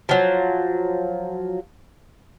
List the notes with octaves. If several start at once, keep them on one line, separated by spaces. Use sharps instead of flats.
F3 F#3